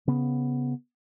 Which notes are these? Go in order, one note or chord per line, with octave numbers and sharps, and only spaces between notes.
C#3 B3